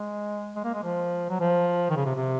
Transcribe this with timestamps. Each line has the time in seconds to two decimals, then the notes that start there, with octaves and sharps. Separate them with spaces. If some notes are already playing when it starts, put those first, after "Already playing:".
Already playing: G#3
0.56 G#3
0.64 A#3
0.74 G#3
0.83 F3
1.30 F#3
1.40 F3
1.90 D#3
1.96 C#3
2.05 C3
2.16 C3